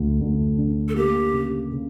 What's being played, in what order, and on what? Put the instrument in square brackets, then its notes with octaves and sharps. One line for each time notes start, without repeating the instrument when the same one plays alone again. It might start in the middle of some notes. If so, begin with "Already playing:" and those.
Already playing: [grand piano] D2 A3
D2
D3
[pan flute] A4
[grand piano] A#3 [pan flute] G4
[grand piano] C#3
C#3